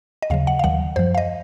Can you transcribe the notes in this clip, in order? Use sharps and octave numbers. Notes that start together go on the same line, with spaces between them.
D#5
D#2 C#3 F#3 F5
F#5
F5
D#2 D#3 F#3 F#5
F#2 F3 C5
F5
D#5